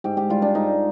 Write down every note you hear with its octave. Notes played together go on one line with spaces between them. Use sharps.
G#2 G4
G4
G3 F4
D4
G#2 D#4